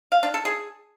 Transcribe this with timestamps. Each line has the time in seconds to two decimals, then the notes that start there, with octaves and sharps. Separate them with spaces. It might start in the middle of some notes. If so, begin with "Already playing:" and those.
0.12 F5
0.23 D4
0.34 A4
0.45 G#4